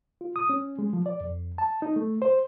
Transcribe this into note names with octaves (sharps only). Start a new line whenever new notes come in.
F4
D#6
C#4
G#3
F3
D5
F2
A5
D#4
A3
C5